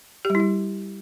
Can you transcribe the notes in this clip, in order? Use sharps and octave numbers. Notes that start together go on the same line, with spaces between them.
G4
G3
E4
G3